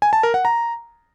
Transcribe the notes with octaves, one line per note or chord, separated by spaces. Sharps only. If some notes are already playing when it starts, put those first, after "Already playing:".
G#5
A5
A#4
F#5
A#5